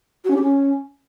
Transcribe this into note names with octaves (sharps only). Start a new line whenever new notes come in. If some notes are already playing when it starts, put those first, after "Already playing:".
F#4
C#4
G4
C#4